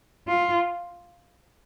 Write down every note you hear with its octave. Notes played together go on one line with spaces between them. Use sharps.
F4